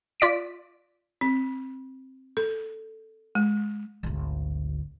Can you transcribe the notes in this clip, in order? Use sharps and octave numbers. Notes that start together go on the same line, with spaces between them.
F4 D5 B6 D7
C4
A4
G#3
G#1 D2